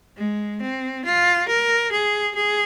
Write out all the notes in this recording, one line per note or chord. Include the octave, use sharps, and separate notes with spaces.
G#3
C4
F4
A#4
G#4
G#4